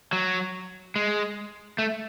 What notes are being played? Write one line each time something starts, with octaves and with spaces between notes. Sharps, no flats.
F#3
G#3
A3